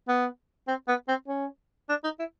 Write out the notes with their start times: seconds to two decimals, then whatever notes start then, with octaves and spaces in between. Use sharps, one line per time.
0.08 B3
0.68 C4
0.88 B3
1.08 C4
1.28 C#4
1.89 D4
2.04 D#4
2.19 E4